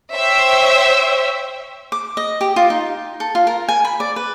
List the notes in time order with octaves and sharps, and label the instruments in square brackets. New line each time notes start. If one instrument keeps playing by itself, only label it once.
[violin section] C5 C#5 E5 G5
[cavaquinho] D6
D#5
G4
F4
D#4
A4
F4
A#4
G#5
B5
D5
B4